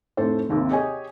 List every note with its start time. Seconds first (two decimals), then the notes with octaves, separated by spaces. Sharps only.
0.17 F1 A2 A4 C5
0.49 G#1 D#2 C3
0.70 G4 G#4 C#5 D#5 G#5